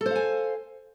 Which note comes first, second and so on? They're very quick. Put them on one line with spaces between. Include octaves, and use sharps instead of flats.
A4 C5 F5 G#5